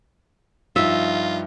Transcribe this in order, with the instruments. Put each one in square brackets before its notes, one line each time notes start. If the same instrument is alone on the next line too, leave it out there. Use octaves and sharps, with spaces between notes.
[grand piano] G2 F3 D#4 [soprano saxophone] F4 [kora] E5